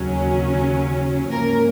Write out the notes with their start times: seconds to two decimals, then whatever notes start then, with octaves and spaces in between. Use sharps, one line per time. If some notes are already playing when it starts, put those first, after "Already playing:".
Already playing: D#2 C#3 F#3 C#4
1.31 G#2 F3 A#3 C#4 A#4